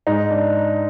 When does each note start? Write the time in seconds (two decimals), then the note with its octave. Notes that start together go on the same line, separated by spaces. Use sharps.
0.07 G#2 D#4
0.31 D4